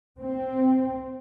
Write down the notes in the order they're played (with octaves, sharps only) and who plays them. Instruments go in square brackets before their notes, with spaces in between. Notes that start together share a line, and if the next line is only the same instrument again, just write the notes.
[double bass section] C4